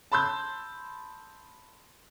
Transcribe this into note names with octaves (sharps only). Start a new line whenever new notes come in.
A5 B5 C6 E6 G6